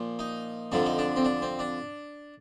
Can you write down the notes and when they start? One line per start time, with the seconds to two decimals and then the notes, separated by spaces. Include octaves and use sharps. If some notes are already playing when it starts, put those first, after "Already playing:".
Already playing: A#2 F3
0.19 D#4
0.72 F2 D3 F3 D4
0.86 D#4
0.98 D4
1.16 C4
1.25 D4
1.42 C4
1.59 D4